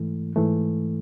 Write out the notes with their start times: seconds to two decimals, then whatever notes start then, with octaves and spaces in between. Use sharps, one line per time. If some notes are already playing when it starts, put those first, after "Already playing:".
Already playing: G#2 E3 A3
0.36 G#2 E3 A3